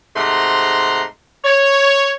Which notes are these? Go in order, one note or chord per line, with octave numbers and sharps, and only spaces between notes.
G#2 C3 A3 F#5 A#5 C6
C#5